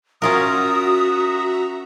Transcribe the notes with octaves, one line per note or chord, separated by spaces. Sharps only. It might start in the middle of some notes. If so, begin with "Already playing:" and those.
C#4 F4 F#4 A#4 E5 A#5 D#6